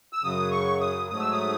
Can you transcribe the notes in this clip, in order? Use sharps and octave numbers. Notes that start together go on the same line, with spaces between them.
E6
F#2 C#3 F#3 D#6
C#6
D#6
G#2 F#3 A3 D#6
E6
D#6